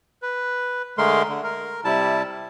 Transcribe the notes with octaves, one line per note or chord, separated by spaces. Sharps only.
B4
D3 G#3 A3 A#4 C6
D3
A#4
C3 G3 E4 A5